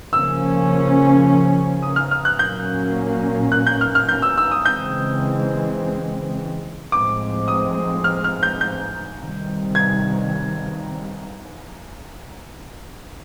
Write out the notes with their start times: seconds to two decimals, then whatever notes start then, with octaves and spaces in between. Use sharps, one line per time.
0.13 C#3 F3 A#3 C#4 E6
1.83 D#6
1.96 F6
2.11 F6
2.25 F#6
2.39 A#2 F#3 A#3 C#4 G6
3.52 F#6
3.67 G6
3.81 F6
3.95 F6
4.09 G6
4.22 E6
4.38 E6
4.51 D#6
4.65 C#3 E3 G#3 C4 G6
6.92 A2 F3 G#3 C4 D6
7.48 D#6
8.04 F6
8.24 F6
8.43 G6
8.61 G6
9.18 C3 D#3 G3
9.75 G#6